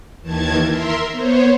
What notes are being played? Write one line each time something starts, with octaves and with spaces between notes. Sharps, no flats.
D#2 D#3 E3 A5 G#6
A#4 E5 C6
B3 C5 C#5